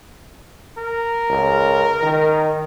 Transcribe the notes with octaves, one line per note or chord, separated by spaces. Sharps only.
A#4
C#2
D#3